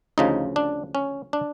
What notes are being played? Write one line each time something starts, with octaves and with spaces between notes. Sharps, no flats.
D2 C#3 F3 D#4
D4
C#4
D4